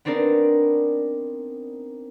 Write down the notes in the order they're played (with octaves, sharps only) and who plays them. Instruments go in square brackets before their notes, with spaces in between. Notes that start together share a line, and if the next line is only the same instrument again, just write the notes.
[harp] B3 C4 D4 D#4 A#4 D5